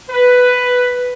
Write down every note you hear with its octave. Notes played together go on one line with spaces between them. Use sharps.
B4